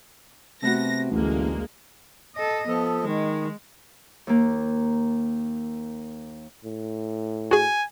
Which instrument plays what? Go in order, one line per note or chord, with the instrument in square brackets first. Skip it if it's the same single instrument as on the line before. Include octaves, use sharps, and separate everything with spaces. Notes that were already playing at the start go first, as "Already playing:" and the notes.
[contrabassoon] C3 [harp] A3 B3 F#4 [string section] A#6
[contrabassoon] A1 [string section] D2 G#3 A#3
[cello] A4 D#5
[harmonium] F3 A4 D#5 [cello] B3
[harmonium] D#3 [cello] G#3
[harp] D#2 A#3
[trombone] A2
[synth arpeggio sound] F#4 G#4 [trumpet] G#5